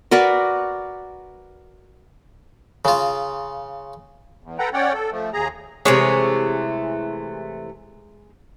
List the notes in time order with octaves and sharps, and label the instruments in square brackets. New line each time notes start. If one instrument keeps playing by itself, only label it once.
[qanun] F#4 A#4 B4 D5
[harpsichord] C#3 F4
[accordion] E2
A4 B4 F#5 G5 A#5
C#4 C#5 D5 F#5 G5
A4
F3 A3
D#2 G#4 A#5
[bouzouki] C3 E3 A3 [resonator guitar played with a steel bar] G#3 G#4 C#5